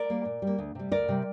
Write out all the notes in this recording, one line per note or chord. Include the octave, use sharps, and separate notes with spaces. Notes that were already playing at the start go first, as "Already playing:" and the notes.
Already playing: A#4 D5
G3 A#3
A#2
G3
A#3
D2
C3 G3
D2 A#4 D5
C3 G3